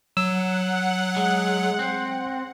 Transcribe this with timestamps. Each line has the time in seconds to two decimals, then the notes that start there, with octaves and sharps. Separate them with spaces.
0.17 F#3 F#5 E6
1.17 G#3
1.79 C4